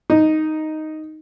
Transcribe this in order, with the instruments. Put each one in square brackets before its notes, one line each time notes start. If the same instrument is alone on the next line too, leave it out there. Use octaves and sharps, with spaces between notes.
[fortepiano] D#4